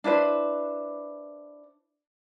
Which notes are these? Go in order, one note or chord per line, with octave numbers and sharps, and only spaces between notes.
D4 E4 B4 C5